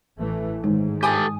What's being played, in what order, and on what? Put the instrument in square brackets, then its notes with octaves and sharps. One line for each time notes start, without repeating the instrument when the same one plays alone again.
[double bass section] A1 E3 A3
[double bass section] G#2 [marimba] D#3 G#3 D#4
[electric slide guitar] G4 A4 [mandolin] G#5 D#6 [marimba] B5